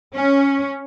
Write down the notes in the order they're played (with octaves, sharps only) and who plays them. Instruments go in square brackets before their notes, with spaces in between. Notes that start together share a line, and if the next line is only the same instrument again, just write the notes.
[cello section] C#4